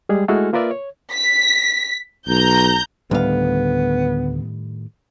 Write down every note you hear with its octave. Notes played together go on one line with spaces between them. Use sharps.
G3 G#3 G#4
G#3 A3 E4 F#4 A4 F6
A#3 F4 A#4 B4 D5 E5
C#5
B6
B1 A#5 G6
D2 A2 D#3 G3 B3 F5